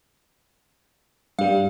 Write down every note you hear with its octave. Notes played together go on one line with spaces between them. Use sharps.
G2 G3 F5